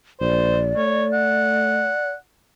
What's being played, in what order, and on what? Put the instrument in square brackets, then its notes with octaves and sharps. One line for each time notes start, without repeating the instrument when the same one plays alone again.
[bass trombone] A#1 [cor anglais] C5 [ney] D5
[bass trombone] A3 [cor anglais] C#5
[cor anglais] F#5